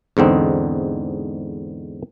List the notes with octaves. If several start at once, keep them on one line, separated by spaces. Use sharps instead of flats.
E2 G#2 D3 C4 D#4